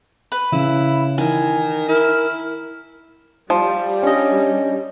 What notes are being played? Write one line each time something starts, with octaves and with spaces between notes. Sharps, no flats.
B4
C#3 E4
D#3 E3 G#5
E4 A#4
F3 G3
C#4 D4 D#5